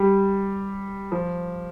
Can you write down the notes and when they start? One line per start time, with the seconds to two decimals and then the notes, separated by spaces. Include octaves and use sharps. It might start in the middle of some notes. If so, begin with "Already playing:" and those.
Already playing: G3
1.12 F3